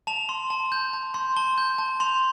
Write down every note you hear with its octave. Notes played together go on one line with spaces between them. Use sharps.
A5 F7
C6
A5
G6
A5
C6
A5 G7
G6
A5
C6 F7